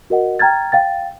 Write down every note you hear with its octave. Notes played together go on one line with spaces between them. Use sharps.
F#4 A#4 D#5 F#5
G5 A#5 F6 G#6 A6
F5 G5 A6